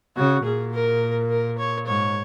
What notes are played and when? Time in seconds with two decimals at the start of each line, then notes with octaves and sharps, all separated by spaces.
0.16 C#3 F#4
0.44 A#2 G#4
0.73 A#4
1.30 A#4
1.58 C#5
1.86 G#2 C#5